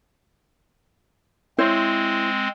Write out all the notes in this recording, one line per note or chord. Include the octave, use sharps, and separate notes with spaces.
G#3 C4 E4 C5 C#5